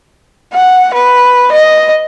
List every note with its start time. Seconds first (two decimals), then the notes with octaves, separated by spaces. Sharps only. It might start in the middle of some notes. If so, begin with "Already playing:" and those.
0.54 F#5
0.94 B4
1.52 D#5